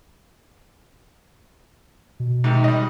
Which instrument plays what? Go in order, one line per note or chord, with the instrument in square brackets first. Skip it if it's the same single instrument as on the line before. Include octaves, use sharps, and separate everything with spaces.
[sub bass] B2
[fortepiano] G#2 C3 D#3
G3 D#5